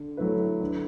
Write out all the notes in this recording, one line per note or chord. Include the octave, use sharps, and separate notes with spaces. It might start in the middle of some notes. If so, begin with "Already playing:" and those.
Already playing: D3
F#3 A3 E4 B4
D3